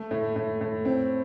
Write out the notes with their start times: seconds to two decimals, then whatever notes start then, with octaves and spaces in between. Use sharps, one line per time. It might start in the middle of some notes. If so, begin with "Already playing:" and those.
Already playing: A3
0.11 A2
0.36 A2
0.61 A2
0.85 C4